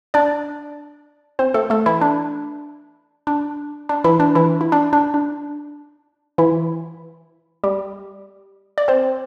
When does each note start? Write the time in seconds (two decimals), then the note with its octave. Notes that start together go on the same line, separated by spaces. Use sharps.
0.14 D4 D5
1.39 C4 C5
1.54 A3 A4
1.70 A3 A4
1.86 E3 E4
2.01 D4
3.27 D4
3.89 D4
4.04 E3 E4
4.20 D4
4.35 E3 E4
4.61 E4
4.72 D4
4.93 D4
5.14 D4
6.38 E3 E4
7.64 G3 G4
8.78 D5
8.88 C4 C5